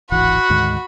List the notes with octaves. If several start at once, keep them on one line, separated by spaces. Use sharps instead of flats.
D1 G#1 E3 F#4 F#5 B5
D2 G#2 D#3